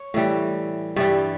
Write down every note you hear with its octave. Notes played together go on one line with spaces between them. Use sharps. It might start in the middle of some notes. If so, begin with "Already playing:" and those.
Already playing: C#5
A2 E3 G3
G2 E3 G3